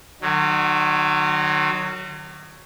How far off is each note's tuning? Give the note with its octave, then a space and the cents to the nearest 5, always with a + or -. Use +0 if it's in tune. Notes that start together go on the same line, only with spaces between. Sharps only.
D#3 -45 F#3 +0